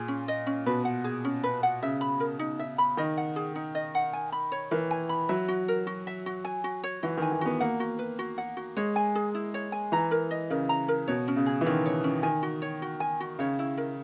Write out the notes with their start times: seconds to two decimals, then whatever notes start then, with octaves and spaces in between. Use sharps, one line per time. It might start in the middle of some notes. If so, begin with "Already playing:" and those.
Already playing: A#2 G#4
0.08 C#4
0.28 D#5
0.47 C#4
0.66 B2 B4
0.85 F#5
1.04 G#4
1.25 C#4
1.43 B4
1.63 F#5
1.82 C#3 E5
2.01 B5
2.20 A#4
2.39 D#4
2.59 E5
2.78 B5
2.97 D#3 D#5
3.17 F#5
3.36 G#4
3.55 D#4
3.75 D#5
3.95 F#5
4.13 G#5
4.32 B5
4.52 C#5
4.71 E3 A#4
4.91 G#5
5.09 B5
5.29 F#3 E5
5.48 F#4
5.68 A#4
5.87 F#4
6.07 E5
6.26 F#4
6.44 G#5
6.64 F#4
6.84 C#5
7.03 E3 F#4
7.17 D#3 G#5
7.32 D#3
7.41 B3 F#4
7.60 A#3 F#5
7.80 F#4
7.99 B4
8.19 F#4
8.38 F#5
8.57 F#4
8.76 G#3 C#5
8.96 G#5
9.15 G#4
9.35 E4
9.54 C#5
9.72 G#5
9.92 E3 A#5
10.11 A#4
10.31 D#5
10.50 C#3 A#4
10.69 A#5
10.88 A#4
11.08 B2 C#5
11.28 C#4
11.37 C#3
11.46 G#4
11.61 E3
11.66 D#3 C#4
11.86 C#5
12.04 C#4
12.23 D#3 G#5
12.43 F#4
12.62 C#5
12.82 F#4
13.00 G#5
13.20 F#4
13.39 C#3 C#5
13.59 E4
13.77 A#4